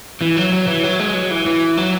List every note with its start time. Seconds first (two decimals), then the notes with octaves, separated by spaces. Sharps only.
0.21 E3
0.36 F#3
0.52 F#3
0.67 E3
0.83 F#3
0.99 G#3
1.14 F#3
1.30 E3
1.46 E3
1.77 F#3